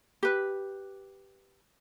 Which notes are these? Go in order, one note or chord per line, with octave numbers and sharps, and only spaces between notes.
G4 B4